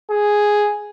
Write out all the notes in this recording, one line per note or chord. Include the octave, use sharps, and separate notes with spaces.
G#4